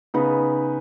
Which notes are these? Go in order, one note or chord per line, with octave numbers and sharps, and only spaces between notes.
C#3 B3 D#4 B4